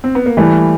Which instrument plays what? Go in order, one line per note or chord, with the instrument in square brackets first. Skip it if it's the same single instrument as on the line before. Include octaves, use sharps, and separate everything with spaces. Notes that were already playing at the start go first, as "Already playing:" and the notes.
[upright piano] C4
B3
A#3
[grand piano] E3 [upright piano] G3 A3